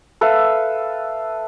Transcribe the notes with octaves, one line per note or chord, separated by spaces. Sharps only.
A4 B4 E5 F5